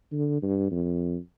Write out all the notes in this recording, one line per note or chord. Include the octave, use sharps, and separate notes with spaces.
D3
G2
F2